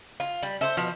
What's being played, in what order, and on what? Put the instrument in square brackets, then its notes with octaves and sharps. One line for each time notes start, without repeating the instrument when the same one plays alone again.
[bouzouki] F4
G3
[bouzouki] A4 C5 [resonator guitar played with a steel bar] E5
[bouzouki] B2 [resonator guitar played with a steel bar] F3